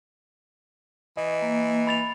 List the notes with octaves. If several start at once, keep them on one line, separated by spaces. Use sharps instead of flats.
E3 D#5
A#3
B5 A6 F7